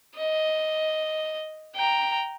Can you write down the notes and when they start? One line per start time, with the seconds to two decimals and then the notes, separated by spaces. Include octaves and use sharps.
0.17 D#5
1.75 G5 A#5